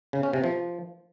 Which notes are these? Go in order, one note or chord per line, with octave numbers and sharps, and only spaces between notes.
C#3
C#4
C3
F3